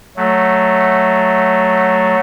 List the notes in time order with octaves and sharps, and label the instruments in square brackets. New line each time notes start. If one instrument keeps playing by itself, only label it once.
[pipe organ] F#3 A3